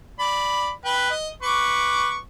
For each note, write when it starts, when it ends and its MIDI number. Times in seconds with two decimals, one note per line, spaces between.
0.20 0.71 74
0.20 0.71 83
0.85 1.10 71
0.85 1.10 79
1.11 1.30 75
1.42 2.16 71
1.42 2.16 85
1.42 2.16 86